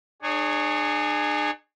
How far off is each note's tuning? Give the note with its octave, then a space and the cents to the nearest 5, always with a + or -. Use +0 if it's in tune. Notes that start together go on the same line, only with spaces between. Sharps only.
D4 +40 G#4 +0 C#5 +0